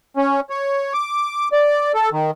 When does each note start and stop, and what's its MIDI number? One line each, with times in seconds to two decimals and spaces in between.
0.17 0.40 61
0.50 0.94 73
0.94 1.48 86
1.52 1.92 74
1.94 2.10 69
2.12 2.31 51